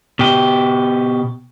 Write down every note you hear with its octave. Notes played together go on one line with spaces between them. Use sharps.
B2 G4